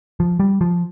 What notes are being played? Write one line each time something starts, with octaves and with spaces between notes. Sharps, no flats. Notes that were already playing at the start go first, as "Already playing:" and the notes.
F3
G3
F3